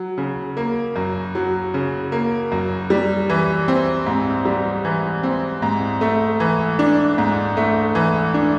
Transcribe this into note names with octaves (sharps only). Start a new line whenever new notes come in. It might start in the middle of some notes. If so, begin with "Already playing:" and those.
Already playing: F#3
C#3
A#3
F#2
F#3
C#3
A#3
F#2
G3
E3
C4
G#2
G3
E3
C4
G#2
A3
E3
D4
G#2
A3
E3
D4